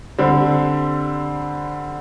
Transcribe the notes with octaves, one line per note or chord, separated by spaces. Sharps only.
D3 G3 C4